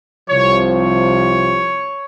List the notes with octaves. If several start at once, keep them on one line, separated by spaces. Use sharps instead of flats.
C2 C3 F3 C#5
C#5